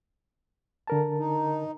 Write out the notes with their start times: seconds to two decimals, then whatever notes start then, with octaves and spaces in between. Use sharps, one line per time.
0.87 D3 A#4 A5
1.18 D#4